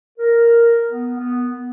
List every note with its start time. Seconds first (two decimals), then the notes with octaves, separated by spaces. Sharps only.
0.18 A#4
0.89 B3
1.19 B3